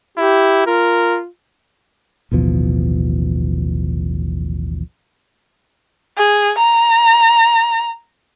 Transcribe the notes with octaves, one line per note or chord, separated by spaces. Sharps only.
E4 G4
F4 A#4
A1 D#2 B2 F3
G#4
A#5